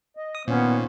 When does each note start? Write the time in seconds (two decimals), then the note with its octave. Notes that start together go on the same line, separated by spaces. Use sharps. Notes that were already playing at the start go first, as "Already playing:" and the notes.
0.17 D#5
0.35 D#6
0.48 A#2 D#3 B3 C#4 C5